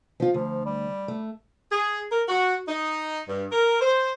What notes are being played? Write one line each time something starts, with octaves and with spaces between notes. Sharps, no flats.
F3 F4
D2 F3
G3
A3
G#4
A#4
F#4
D#4
G2
A#4
C5